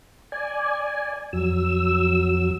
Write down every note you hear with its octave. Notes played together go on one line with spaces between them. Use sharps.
D5 G#5
F2 F#3 E6